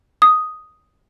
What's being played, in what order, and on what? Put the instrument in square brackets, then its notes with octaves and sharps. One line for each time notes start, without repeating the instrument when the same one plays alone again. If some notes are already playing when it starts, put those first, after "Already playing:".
[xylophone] D#6